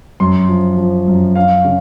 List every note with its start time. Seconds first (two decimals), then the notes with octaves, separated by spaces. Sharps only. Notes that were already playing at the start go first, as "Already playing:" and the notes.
0.20 F#2 C6
0.49 F3
0.77 F3
1.08 F#2
1.35 C#4 F5
1.65 C#3